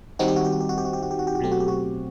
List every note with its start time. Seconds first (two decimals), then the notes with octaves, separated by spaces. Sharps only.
0.19 D#3 G3 C4 D#4 F#4
0.28 G4
0.36 F#4
0.44 G4
0.52 F#4
0.61 G4
0.69 F#4
0.78 G4
0.85 F#4
0.93 G4
1.02 F#4
1.11 G4
1.19 F#4
1.27 G4
1.35 F#4
1.40 B2 F#3 A3 C4 G4
1.52 F#4
1.60 G4
1.68 F#4